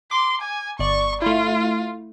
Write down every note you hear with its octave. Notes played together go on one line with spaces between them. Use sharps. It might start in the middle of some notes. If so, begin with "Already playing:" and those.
C6 D6
G#5
G1 D5 C#6
A3 E4 F4